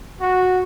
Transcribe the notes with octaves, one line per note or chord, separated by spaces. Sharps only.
F#4